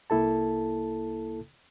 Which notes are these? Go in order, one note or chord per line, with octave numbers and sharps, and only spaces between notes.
C2 A#3 E4 A4 A5